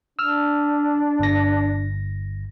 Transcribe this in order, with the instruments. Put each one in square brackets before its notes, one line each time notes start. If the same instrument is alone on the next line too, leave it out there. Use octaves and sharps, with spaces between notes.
[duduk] D4 [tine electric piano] E6 F6
[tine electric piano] G1 A#6